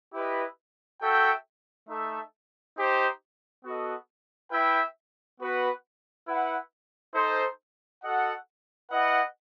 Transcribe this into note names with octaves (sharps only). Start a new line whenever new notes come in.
E4 G4 B4 D#5
F#4 A4 E5 G5
A3 D#4 A4 E5
D#4 G4 C5
B3 F#4 A4 D#5
E4 B4 E5 G5
B3 F#4 B4 F#5
E4 B4 F#5
D#4 A4 C5
F#4 A4 D#5 F#5
E4 B4 D#5 F#5